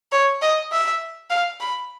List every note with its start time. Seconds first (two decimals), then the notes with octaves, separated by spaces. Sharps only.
0.12 C#5
0.41 D#5
0.72 E5
1.30 F5
1.61 B5